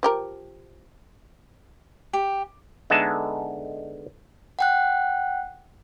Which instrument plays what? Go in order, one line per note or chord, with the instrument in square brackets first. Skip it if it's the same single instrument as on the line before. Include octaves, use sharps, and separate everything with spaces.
[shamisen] F3 G4 A#4
[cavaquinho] G4
[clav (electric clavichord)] D3 G#3 B3 D#4 E5 A5
[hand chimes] F#5 G5 F#6